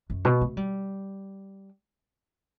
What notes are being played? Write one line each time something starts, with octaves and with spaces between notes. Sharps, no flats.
F#2
B2
A3
G3